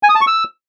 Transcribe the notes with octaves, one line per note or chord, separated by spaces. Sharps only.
G#5
D#6
A5
C#6
E6